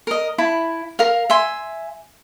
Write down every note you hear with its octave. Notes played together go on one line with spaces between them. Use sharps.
A#4 D#5
E4 A5 B5
A#4 F5
E5 G#5 C6